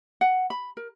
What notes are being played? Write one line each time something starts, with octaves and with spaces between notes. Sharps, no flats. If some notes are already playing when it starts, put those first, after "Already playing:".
F#5
B5
A#4